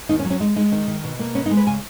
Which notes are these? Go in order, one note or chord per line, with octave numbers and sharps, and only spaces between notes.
D#2 D#4
C#4
F#3
C#4
G#3 D#4
G#3 D#4
D#3 D#4
D#3
B2
A#3
B3 C#4
D#4
G#3
B4
C#3 G#5